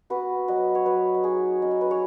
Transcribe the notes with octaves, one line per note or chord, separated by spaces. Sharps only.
B3 F#4 B4
F#3 B4 D#5
C#5
F#3 B4 D#5
D#5
D#4 G#4 C#5
C#4 D#5
C#5
B4
G#4 C#5